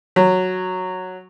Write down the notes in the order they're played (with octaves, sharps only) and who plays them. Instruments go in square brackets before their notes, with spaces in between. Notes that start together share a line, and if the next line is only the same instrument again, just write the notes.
[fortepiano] F#3